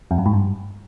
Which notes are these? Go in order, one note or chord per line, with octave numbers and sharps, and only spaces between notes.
F2
F#2
G#2
G2